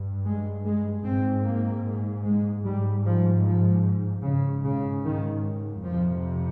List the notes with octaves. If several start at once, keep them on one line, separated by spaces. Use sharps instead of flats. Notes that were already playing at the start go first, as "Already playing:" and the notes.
Already playing: G2
G#3
G#3
G#2 C4
A#3
G#3
G#2 G3
F3
F3
G#2 C#3
C#3
D#3
F2 C3 F3